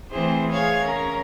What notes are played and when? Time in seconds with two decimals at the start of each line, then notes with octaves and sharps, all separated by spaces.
0.10 E3 A3 C4 E4 G#4 C5
0.50 G#4 C#5 F5 G#6
0.83 C#4 A#4 A#5